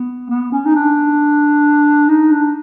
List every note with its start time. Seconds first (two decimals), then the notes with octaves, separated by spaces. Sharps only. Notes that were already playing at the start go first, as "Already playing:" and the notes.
Already playing: B3
0.30 B3
0.52 C#4
0.65 D#4
0.75 D4
2.09 D#4
2.32 D4